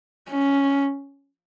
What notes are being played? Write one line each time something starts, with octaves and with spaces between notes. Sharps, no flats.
C#4